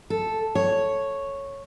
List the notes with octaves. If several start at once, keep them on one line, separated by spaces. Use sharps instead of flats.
A4
C#5